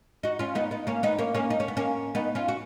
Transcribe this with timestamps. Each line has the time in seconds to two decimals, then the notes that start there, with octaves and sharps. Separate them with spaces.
0.23 D#4 F#4
0.39 C#4 F4
0.55 B3 D#4
0.71 B3 D#4
0.87 A#3 C#4
1.03 B3 D#4
1.19 A#3 C#4
1.34 A#3 C#4
1.50 D#4
1.60 C#4
1.68 B3
1.77 A#3 C#4
2.15 B3 D#4
2.35 C#4 F4
2.48 F#4